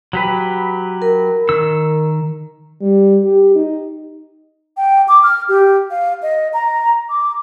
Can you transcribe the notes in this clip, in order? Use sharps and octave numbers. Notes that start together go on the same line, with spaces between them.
F#3 G4 B4
A#4
D#3 E6
G3
G4
D#4
G5
D6
F6
G4
F5
D#5
A#5
D6